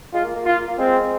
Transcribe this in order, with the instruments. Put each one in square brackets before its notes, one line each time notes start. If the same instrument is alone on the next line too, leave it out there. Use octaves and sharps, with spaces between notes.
[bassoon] G#3 [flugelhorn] F4
[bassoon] A#3
A#3
[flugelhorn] F4
[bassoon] A#3
[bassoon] G#3 [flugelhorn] C4